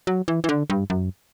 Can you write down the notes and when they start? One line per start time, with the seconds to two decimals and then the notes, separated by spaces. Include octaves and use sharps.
0.07 F#3
0.28 E3
0.44 E3
0.49 D3
0.70 G2
0.90 F#2